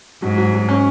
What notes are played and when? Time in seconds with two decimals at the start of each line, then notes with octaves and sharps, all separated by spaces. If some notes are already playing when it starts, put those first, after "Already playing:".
0.22 G#2 F#3
0.38 F#3
0.53 F#3
0.69 C#4